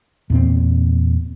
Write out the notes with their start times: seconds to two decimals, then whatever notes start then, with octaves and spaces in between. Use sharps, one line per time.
0.30 E2 A#2 C4